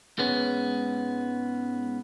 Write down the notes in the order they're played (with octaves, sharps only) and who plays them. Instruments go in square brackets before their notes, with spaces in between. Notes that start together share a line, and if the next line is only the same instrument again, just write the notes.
[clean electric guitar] G#2 G#3 B3 C#4